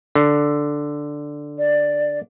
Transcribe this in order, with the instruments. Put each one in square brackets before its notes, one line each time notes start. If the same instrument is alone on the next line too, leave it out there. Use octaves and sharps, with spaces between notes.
[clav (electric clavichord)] D3
[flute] D5